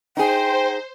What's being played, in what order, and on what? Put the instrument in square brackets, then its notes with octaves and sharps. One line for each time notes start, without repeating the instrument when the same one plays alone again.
[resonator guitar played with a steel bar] D#4 G#4 [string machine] C5 [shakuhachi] G5